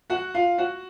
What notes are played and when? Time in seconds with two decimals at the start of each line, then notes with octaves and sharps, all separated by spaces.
0.10 F#4 F#5
0.34 F4 F5
0.58 F#4 F#5